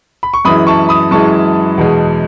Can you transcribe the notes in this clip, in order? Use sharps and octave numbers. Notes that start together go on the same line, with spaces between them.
B5
C#6
F#2 E3 G#3 B5 D#6
A5 C#6
B5 D#6
F#2 E3 G#3 A5 C#6
E2 B2 G#3